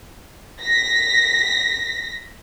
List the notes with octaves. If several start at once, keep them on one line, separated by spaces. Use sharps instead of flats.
A#6 B6